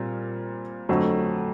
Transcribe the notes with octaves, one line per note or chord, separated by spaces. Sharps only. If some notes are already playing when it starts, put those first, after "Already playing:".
Already playing: A#2 G3 C4 F4
F2 D3 F#3 A3